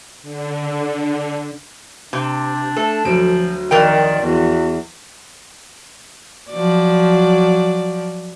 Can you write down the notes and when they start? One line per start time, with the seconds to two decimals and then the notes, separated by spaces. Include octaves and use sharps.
0.22 D3
2.13 C3 D4
2.76 A3 A4
3.05 D2 F3 F#3 D7
3.71 F2 D#3 A#4 D5 G5
4.25 E2 F#4
6.51 F3 F#3 D5